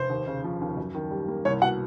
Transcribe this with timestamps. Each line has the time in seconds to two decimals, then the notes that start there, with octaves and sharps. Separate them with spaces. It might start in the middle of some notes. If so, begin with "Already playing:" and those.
Already playing: F1 C5
0.10 D#2
0.27 C#3
0.44 F3
0.61 D#2
0.77 F#2
0.94 D#3
1.11 G3
1.28 A#3
1.45 C2 C#5
1.62 B2 F#5